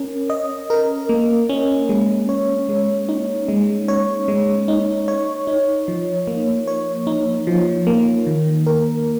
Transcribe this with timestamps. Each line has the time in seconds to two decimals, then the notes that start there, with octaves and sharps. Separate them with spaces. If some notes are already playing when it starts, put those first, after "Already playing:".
Already playing: C#4 A#4
0.30 D#5
0.70 A#4
1.09 A#3
1.49 C#4
1.89 G#3
2.29 C#5
2.69 G#3
3.09 D#4
3.48 G#3
3.88 C#5
4.28 G#3
4.68 D#4
5.08 C#5
5.47 D#4
5.88 F3
6.27 A#3
6.68 C#5
7.07 D#4
7.47 F3
7.87 A#3
8.27 D#3
8.67 A#4